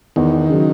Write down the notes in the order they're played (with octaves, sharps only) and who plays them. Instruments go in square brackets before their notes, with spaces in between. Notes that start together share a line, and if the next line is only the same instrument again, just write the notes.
[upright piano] E2 [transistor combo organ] D#3
[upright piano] C#3 F#3